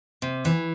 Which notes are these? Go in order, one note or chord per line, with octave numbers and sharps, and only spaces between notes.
C3
E3